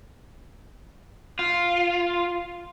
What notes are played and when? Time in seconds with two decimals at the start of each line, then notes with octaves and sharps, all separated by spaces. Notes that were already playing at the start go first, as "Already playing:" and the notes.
1.39 F4